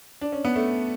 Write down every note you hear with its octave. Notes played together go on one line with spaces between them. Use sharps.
D4
C#4
B3
A3